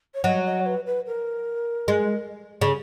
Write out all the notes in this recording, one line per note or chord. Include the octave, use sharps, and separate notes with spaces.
C#5
F#3 D#5
D#5
C#5
B4
B4
A#4
G#3
C#3